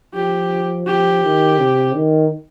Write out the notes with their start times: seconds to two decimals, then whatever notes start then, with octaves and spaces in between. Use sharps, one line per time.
0.14 F3 G4
0.86 F3 G4
1.23 D#3
1.58 C3
1.95 D#3